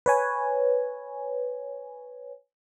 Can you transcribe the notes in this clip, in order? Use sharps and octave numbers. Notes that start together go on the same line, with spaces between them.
B4 C#5 G#5